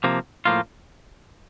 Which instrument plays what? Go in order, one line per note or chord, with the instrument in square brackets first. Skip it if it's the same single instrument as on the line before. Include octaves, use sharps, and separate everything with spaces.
[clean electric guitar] C3 F3 A#3
A2 F3 A#3 F4